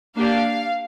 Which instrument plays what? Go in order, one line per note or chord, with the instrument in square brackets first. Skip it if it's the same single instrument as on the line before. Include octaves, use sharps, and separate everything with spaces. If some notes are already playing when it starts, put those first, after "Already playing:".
[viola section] A#3 D4 G4 D5 [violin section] F5